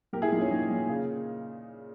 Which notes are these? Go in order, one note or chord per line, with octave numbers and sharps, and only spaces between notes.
A#2 G4 A#4
E4 G#4
A#2 D#4
C#4
A#2 D#4
A#2
C#3